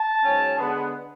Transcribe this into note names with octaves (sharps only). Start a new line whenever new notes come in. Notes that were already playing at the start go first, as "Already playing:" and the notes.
Already playing: A5
G#2 F#3 C#4
D3 G#3 B3